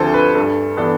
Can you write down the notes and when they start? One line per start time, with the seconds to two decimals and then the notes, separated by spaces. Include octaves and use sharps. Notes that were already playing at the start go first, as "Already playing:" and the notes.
Already playing: D2 D3 F3 C4 A4 C5
0.14 B4
0.35 G2 A4
0.77 E3 B3 D4 A4